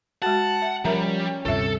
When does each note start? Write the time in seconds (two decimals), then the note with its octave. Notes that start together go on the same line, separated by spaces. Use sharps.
0.22 G#3 F#4 F#5 A5
0.62 E5
0.85 F3 G3 C#4 A#4 E5 A#5
1.45 D2 G2 C3 F4 A4 E5